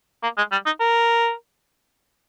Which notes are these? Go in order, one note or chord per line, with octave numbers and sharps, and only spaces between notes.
A#3
G#3
G3
D#4
A#4